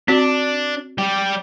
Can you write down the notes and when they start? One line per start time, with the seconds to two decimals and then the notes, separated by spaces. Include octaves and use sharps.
0.08 C4 D4 F#4 D5
0.98 G3 G4